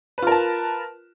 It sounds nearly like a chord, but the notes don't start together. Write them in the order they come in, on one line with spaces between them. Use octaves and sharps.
B4 F4 A#4 A5